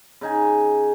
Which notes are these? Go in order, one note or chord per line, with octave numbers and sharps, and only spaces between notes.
C#3 D#4 G#5